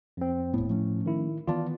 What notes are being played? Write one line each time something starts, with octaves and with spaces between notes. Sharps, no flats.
F2 C4
D#1 A2 B3
F3 A3 C#4
D#3 E4
D#3 E3 B3 F4 D5 A5